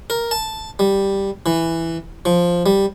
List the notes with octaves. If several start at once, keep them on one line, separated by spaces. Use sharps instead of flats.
A#4
A5
G3
E3
F3
G3